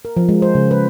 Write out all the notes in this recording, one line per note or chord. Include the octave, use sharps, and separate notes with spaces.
A#4
F3
G#3
C5
C#3
B4